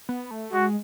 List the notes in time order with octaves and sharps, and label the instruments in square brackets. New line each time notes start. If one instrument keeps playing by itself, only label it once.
[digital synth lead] B3
A3
[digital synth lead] G#3 [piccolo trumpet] F#4